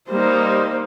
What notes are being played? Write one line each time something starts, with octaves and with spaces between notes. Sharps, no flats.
G3 A#3 D#4 C5